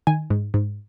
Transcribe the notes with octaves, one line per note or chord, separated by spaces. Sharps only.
D#3 G#5
G#2
G#2